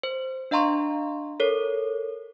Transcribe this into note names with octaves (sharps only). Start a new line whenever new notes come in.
C5
D4 D#5 F5 A#5 C6 C#6
A4 A#4 C#5